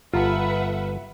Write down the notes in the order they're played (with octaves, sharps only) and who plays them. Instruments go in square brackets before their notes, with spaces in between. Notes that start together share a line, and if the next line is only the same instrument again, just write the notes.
[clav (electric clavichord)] G1 A4 A#5 [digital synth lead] F4 [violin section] B4 E5 F#5